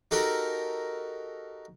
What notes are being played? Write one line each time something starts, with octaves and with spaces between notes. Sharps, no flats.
D#4 F#4 G4 A4 A#4